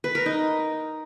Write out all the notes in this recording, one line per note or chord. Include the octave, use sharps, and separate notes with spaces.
B4
A#4
D#4